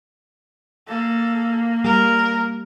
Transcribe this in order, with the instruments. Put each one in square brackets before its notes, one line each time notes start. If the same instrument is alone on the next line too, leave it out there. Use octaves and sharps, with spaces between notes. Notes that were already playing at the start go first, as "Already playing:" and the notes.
[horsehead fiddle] A#3 [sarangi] A4
[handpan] G3 [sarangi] A#4